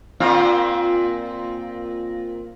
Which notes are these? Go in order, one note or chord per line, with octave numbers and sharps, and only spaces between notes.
A#2 C4 F4